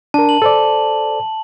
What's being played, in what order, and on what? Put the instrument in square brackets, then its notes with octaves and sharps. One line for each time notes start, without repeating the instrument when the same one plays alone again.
[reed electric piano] D4 A#4 [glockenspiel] A5
[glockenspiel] F#7
[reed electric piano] A4 C5 D5